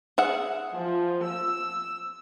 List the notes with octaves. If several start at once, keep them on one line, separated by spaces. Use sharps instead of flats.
G#4 E5 F#5
F3
E6